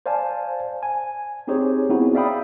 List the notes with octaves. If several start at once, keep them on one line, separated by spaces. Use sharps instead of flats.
C5 D5 F5 G#5 A5
G#5
C4 D#4 G4 G#4 C5 C#5
B3 C4 D#4 E4 F#4 G#4
D5 E5 F5 G5 B5 D#6